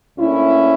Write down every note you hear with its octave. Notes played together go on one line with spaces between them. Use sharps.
D2 D3 A#3 C#4 E4